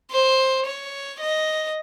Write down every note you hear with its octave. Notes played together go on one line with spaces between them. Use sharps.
C5
C#5
D#5